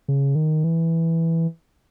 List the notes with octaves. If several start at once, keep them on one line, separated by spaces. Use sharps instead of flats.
C#3
D#3
E3